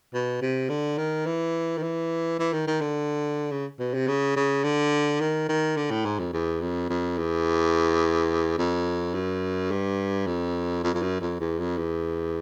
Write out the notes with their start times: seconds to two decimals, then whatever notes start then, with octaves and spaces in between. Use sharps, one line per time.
0.14 B2
0.42 C3
0.69 D3
0.98 D#3
1.26 E3
1.78 D#3
1.82 E3
2.39 E3
2.53 D#3
2.67 D#3
2.81 D3
3.52 C#3
3.79 B2
3.94 C3
4.08 C#3
4.36 C#3
4.64 D3
5.21 D#3
5.49 D#3
5.77 D3
5.91 A2
6.05 G#2
6.19 F2
6.33 E2
6.61 F2
6.89 F2
7.18 E2
8.58 F2
9.14 F#2
9.71 G2
10.27 F2
10.84 F2
10.94 F2
11.02 F#2
11.21 F2
11.40 E2
11.59 F2
11.77 E2